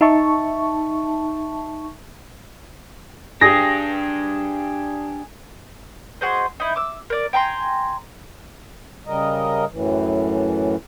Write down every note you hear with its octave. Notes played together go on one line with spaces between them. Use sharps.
D#4 E5 A5 C#6
D4 G4 G#4 A#6
F#4 G#4 C5 D#5
D#4 E4
D6 E6
A#4 D5
G5 G#5 A#5 C6
C#3 G3 A#4 D#5
F#2 A2 E3